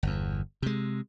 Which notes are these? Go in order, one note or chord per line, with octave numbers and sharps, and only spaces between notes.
G1 E2
C3 G#3